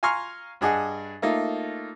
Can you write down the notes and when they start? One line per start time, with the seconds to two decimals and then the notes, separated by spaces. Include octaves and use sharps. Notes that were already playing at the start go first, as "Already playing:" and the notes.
0.03 F5 G#5 A#5 C6 C#6 F6
0.61 G2 D4 G#4 D#5 F#5
1.22 A3 A#3 D#4 F4